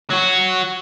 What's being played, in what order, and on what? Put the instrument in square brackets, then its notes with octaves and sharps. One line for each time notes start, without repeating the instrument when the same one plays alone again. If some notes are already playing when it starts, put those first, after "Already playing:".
[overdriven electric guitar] F#3 F#4